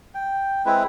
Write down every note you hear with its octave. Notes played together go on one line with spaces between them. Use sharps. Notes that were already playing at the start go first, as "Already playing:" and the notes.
G5
G#3 C4 E4 B4